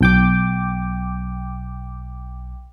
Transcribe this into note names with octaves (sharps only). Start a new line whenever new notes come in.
B1 G5 D6